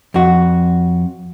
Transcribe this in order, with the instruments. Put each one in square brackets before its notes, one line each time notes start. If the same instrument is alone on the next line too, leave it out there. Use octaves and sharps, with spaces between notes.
[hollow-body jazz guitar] F2 F#4